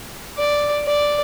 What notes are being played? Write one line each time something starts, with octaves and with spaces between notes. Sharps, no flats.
D5
D5